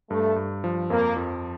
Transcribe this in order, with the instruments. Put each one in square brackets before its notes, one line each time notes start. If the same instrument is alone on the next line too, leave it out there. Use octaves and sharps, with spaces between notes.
[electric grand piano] G2 [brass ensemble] A3
[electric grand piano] G2
F3
[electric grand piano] F2 [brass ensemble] A#3
[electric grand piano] F2